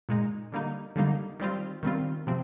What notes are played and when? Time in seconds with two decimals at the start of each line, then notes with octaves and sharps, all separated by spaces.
0.09 A#2 G#3 D#4
0.52 D3 G3 A#3 D#4
0.96 D3 G3 A#3 D#4
1.40 D#3 G3 C4 F4
1.83 D#3 G3 C4 F4
2.27 C3 F3 C4